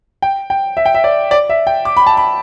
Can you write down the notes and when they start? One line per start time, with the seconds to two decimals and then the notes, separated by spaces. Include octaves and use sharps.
0.22 G5
0.50 G5
0.77 E5
0.86 G5
0.95 E5
1.04 D5
1.31 D5
1.50 E5
1.67 G5
1.85 D6
1.97 B5
2.06 A5
2.17 B5